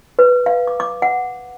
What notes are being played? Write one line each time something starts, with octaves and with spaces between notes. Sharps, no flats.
B4
F5
D6
D6
F#5